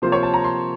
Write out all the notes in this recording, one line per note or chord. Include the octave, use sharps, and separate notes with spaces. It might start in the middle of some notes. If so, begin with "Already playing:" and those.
C3 F3 A#3 F4 C5
C#5
A5
A#5
C6